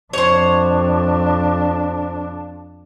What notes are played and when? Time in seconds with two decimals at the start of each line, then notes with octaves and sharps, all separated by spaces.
0.13 F2 D4 C5 C#5